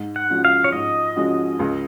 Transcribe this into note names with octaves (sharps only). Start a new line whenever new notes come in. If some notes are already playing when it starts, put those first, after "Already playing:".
Already playing: G#2
F#5
F3 G#3 C#4 F#4
F5
C#5
G#2 D#5
F3 G#3 C#4 F#4
C#2